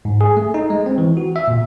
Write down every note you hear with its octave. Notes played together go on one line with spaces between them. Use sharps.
G#2
G#4
A3
D#4
G#3
C4
E3
F#4
E5
A#2